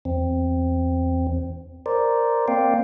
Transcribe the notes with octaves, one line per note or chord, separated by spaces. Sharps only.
E2 C4
A#4 C5 D5
A#3 C4 D5 F5 G5